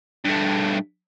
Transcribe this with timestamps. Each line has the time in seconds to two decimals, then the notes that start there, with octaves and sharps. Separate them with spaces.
0.25 G2 A3